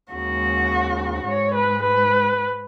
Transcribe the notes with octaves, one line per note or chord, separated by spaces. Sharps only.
D#2 C#3 G#3 F#4
G#2 G#3 C#5
B4
B4